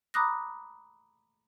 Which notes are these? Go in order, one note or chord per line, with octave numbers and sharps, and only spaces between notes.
A#5 B5 D6 D#6 F#6 A#6